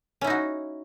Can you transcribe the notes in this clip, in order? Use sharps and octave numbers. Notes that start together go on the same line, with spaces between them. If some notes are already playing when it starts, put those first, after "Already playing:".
C#4 D#4 E4 F#4